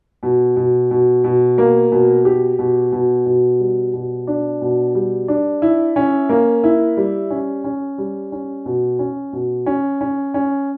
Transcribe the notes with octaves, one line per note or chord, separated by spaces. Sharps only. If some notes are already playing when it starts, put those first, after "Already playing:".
B2
B2
B2
B2
A#3
B2
G4
B2
B2
B2
G3
B2
D4
B2
G3
D4
E4
C#4
A#3
E4
G3
C#4
C#4
G3
C#4
B2
C#4
B2
C#4
C#4
C#4